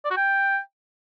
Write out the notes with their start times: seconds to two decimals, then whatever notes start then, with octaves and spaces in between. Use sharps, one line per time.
0.04 D5
0.11 F#4
0.17 G5